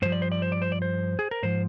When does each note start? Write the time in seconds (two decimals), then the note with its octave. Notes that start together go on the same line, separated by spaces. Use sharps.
0.02 G2 F3 C5
0.12 D5
0.22 C5
0.32 D5
0.42 C5
0.52 D5
0.62 C5
0.72 D5
0.82 C5
1.19 G#4
1.31 A#4
1.43 G#2 F3 C5